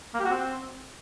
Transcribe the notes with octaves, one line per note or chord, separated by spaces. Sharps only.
A#3
G4
F#4
C4